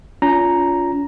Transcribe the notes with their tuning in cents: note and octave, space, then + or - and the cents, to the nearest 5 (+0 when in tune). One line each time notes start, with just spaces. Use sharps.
C#4 +40 F4 +0 A#5 +0